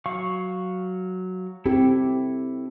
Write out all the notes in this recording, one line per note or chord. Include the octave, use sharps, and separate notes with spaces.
F#3 F5 C#6
C4 E4 G4 A4